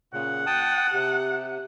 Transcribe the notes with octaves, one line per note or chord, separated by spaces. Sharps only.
A#2 C#3 F#5
G5 A5 D#6
C3 G4